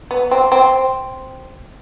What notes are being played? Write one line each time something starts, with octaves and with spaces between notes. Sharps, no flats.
B3
C4
C4